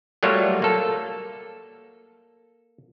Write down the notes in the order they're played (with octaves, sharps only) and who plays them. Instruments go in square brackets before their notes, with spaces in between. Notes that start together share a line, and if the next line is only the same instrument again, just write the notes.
[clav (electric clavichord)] F#3 G3 A3 A#3 F4 C#5
A#3 A4